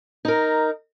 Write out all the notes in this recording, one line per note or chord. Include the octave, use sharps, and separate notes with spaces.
D#4 A#4